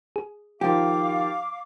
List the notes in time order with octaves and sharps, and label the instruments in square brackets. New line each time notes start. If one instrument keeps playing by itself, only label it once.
[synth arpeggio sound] G#4
[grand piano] D#3 F3 [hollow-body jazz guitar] G4 [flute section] F5 D6